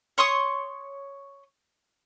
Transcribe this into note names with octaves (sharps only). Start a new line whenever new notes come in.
C#5 C6 C#6 D#6